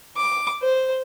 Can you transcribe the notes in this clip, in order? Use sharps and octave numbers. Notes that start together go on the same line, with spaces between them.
D6
C5